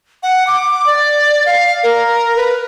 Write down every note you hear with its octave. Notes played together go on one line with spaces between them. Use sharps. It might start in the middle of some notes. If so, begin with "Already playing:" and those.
F#5
D6
D5
F5
A#4
B4